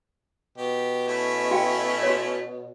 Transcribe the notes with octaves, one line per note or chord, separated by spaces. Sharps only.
B2 G4
A3 C#4 E4
F#4 F5 G5
F#4 C#5